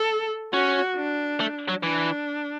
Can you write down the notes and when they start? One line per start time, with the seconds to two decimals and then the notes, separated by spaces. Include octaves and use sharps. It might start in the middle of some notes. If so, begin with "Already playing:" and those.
Already playing: A4
0.53 C#4 F#4
0.96 D4
1.40 A3
1.69 F#3
1.83 E3 D4